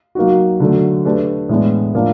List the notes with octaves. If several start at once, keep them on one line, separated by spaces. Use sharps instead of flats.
F#3 A#3 D#4 F#4
D3 F#3 A3
A3 D4 G4 B4
A2 E3 G#3 B3 D4
A2 F3 A#3 D4